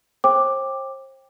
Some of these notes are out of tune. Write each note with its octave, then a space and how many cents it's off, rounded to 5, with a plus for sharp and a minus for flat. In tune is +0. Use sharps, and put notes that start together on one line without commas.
C5 +40 G5 +10 D6 +5